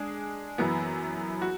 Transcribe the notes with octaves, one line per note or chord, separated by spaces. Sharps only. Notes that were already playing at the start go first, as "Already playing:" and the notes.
Already playing: G#3 D4 G#4
F#2 E3 B3
F#4